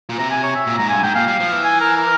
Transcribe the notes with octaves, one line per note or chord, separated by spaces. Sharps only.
A#2
C3 A#5
G#5
C#5
E5
A#2
G#2 A#5
G2 G#5
G#2 G5
A#2 F5
G3
F3
E3
G#5
A#4
A#4